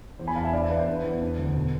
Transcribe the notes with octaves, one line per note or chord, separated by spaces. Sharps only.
E2 C5
G#5 B5
E2 F5 A5
E5 G#5
D4 D5 F5
C5 E5
E2 B4 D5
C5
D4 B4
E2
D4 C5
D2
B2